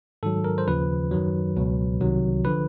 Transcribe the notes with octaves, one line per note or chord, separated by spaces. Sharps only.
G#2 D#3 F#3 A4
A#4
C5
D#2 C#3 F3 B4
F#2 D#3 F#3
C#2 B2 F#3
C2 C3 D#3 F#3
D3 F3 B4